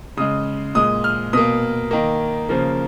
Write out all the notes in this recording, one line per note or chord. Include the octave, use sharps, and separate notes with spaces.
C#3 G#3 D#6
A#2 G#3 D#6
F6
B2 A#3 D#6
D#3 A#3
C#3 F3 A#3